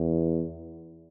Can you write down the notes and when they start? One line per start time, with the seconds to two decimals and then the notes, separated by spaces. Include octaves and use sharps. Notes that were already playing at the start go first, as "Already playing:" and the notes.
Already playing: E2